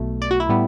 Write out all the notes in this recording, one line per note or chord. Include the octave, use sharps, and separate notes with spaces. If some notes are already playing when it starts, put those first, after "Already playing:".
Already playing: B1 B2 A3
D5
F#4
E4
A2 G3 B3